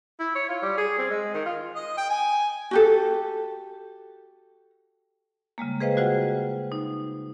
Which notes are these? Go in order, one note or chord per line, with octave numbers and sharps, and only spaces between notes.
E4
C#5
F4
G3
G#4
C4
G#3
D#3
F4
D#5
G5
G#5
F#4 G4 A4
C#3 G3 G#3 A#3
G#4 B4 C5 D#5 F5 G5
F4 F#4 G#4 C5 F#5 G5
D#4